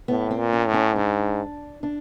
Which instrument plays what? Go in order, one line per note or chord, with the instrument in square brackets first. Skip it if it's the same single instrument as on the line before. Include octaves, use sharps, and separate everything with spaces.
[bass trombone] A2 [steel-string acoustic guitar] B3
[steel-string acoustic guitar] C4
[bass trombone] A#2
[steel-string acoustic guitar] C#4
[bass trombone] A2
[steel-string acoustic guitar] C#4
[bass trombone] G#2 [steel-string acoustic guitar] D4
[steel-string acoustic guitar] D4